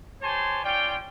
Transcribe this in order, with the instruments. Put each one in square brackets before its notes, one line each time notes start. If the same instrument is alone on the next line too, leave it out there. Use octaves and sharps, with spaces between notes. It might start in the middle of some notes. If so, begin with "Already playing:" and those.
[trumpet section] G4 C5 C#5 G#5 A5 C6
C#4 F4 D5 G5